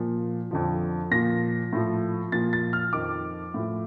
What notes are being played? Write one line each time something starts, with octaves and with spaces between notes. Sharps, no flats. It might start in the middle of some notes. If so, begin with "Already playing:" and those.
Already playing: A#2 F3
F2 D3 F3
A#2 F3 A#6
A2 F3
A#2 F3 A6
A6
F6
F2 D#3 D6
A2 F3